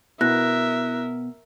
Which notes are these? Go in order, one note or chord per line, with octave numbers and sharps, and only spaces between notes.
B2 E4 A#4 E5 F#6 A#6